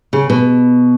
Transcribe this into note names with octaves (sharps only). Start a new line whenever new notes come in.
C#3
B2